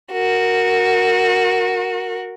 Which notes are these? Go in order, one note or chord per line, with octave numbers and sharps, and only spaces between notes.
F#4 A#4